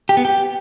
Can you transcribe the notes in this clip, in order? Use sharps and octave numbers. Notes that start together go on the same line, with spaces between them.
G4
B3
G4